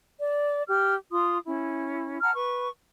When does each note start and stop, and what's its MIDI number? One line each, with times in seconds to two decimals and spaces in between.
0.20 0.62 74
0.67 0.94 67
0.67 0.94 89
1.12 1.38 65
1.12 1.38 84
1.12 1.38 87
1.46 2.18 61
1.46 2.18 64
2.22 2.31 78
2.22 2.31 81
2.22 2.31 82
2.22 2.31 89
2.34 2.68 71
2.34 2.68 85